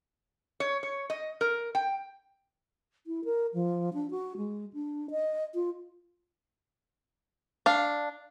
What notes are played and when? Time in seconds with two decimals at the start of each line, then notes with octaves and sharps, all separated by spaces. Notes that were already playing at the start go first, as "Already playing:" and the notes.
0.60 C#5
0.83 C#5
1.10 D#5
1.41 A#4
1.75 G5
3.07 E4
3.24 A#4
3.54 F3
3.94 D4
4.11 F#4
4.37 G#3
4.73 D4
5.11 D#5
5.54 F4
7.66 D4 F5